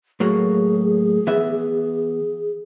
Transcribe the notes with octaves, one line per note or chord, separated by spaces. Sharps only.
A2 F#3 A#3 G#4
E3 B3 E5